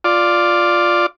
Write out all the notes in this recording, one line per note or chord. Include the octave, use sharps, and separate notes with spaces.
F4 D5